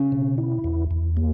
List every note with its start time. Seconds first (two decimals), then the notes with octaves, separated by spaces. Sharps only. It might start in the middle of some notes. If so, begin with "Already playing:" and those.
Already playing: C#3
0.12 B2
0.38 E4
0.64 E2
0.91 E2
1.17 A#3